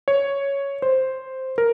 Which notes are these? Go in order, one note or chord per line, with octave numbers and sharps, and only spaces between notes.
C#5
C5
A#4